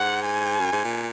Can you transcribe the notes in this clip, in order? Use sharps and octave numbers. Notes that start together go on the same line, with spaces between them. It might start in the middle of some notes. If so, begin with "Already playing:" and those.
Already playing: G#2 F#5
G#5
F#2
G#2
A#2